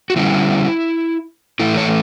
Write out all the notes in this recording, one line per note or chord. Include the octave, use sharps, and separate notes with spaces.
F#4
D3 G3 C#4 E4
A2 E3 A3 E4
C#5